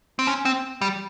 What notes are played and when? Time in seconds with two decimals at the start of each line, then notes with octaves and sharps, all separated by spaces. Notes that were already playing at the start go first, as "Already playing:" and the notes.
0.19 C4
0.27 C#4
0.45 C4
0.81 G3